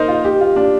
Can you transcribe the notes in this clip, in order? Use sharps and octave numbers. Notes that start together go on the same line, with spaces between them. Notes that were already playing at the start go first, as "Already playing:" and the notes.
Already playing: D#4 A#4 C5
F4
G4
F4
D4